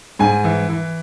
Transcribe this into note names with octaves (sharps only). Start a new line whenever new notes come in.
G#2 G#5
E3
E3